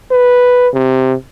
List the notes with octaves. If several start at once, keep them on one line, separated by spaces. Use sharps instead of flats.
B4
C3